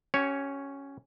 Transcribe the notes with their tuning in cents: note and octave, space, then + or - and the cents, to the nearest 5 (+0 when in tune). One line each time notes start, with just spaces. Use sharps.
C#4 +0 G4 -40 C#5 +0